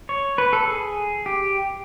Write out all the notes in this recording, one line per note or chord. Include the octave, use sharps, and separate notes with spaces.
C#5
B4
A4
G#4
G4